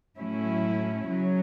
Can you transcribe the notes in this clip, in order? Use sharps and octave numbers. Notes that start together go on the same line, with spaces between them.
A2 F#3 C#4 E4
C#3 F#3 C#4